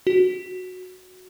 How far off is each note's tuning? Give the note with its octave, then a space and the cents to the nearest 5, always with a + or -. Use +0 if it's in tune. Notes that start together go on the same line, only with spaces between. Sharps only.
F#4 -5